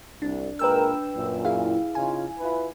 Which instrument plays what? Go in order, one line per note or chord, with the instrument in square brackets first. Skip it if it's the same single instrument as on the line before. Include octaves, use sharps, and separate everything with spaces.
[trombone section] C2 [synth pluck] D4
[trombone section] A#2 G#3 A#4 [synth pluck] B4 G5 E6
[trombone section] F#2 A#2
[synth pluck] E4 G#4 F5
[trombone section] C#3 D#4 F4 [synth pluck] G#5
[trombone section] E4 F4 B4